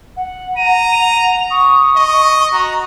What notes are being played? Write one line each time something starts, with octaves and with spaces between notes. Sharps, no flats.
F#5
A#5 D#7
F#5 F7
C#6 D#6
D#5
F#4 A#5